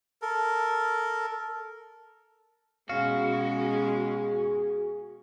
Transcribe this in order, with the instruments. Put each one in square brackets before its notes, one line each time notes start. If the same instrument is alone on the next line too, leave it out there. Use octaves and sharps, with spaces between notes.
[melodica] A4 A#4
[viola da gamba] B2 G#3 C#4 [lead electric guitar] F#4 [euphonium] G#4 [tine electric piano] F5